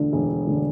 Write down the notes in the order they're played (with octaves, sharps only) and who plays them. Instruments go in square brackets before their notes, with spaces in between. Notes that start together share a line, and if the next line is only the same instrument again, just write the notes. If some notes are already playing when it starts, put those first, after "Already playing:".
Already playing: [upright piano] E1 D2 D3
E1
D2 D3